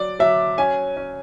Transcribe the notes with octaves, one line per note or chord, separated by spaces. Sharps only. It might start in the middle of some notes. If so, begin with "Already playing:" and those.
Already playing: F#3 D5
F#3 E5
C#4 G#5
C#4